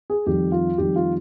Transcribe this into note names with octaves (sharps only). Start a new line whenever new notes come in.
G#4
F2 D#3 G3 G4
F4
F2 D#3 G3 G4
F4